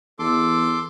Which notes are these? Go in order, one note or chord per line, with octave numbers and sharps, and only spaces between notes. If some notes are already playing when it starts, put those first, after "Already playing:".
E2 A4 C6 D6